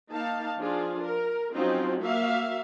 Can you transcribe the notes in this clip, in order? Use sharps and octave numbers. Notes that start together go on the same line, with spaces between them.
A#3 D#4 F5 A5
F3 D4 F4 G#4
A#4
F3 F#3 C4 C#4 D#4 F4
A#3 F#4 E5 F5